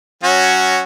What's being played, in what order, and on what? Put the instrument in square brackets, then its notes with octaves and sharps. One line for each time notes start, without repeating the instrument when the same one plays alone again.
[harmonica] F#3 C#4 F#4